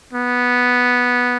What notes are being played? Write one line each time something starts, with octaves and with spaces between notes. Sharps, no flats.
B3